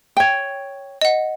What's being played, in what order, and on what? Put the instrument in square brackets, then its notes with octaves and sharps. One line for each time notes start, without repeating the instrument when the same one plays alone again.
[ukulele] C#5 G5
[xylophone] D#5 F#5